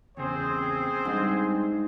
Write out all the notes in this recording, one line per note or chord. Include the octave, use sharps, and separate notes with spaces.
E2 C#3 C4 G#4 C5
G#2 G3 D4